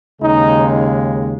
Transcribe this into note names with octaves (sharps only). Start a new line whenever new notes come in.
D#2 C#3 G#3 D#4